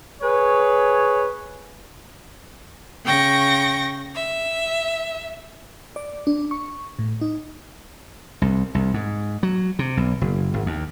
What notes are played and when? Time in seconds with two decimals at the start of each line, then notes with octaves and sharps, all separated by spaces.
0.22 G#4 B4 C#5
3.05 C#3 G5 C#6 A#6
4.15 E5
5.96 D5
6.27 D4
6.51 C#6
6.99 A2
7.21 D#4
8.42 C2
8.75 C2
8.94 G#2
9.43 F#3
9.79 C3
9.97 B1
10.21 F#1
10.54 G#1
10.66 D#2